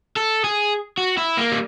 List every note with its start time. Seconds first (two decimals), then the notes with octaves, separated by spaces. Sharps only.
0.17 A4
0.44 G#4
0.98 F#4
1.18 E4
1.38 A#3
1.52 G3